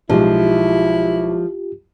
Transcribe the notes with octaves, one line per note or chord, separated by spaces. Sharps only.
B1 F3 G#3 E4 F4 G4